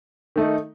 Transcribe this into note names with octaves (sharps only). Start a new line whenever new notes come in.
D#3 A3 D#4